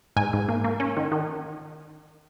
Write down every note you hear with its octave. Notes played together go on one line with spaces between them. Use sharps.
G#2 G#5
G#2
A#3
A#3
C#4
D#3
D#3